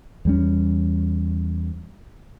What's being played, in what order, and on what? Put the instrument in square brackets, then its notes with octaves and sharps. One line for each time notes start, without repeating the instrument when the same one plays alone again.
[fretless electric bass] E2 G3 C#4